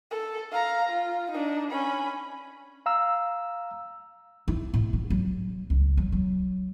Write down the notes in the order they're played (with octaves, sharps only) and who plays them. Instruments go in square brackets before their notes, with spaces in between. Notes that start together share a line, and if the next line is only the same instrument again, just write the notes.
[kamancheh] A4
F5 A#5
F4
D4 D#4
C#4 B5
[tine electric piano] F5 A#5 E6
[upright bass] E4
A2
F4
F#3
C#2
F#3
F#3